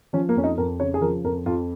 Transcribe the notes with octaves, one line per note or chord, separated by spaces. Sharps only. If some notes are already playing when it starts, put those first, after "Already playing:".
F3 C#4
A#3
F2 C#4
D#4
F2 A#4
C#3 C#5
G#4
F3 A#4
F2 A#4
F2 F4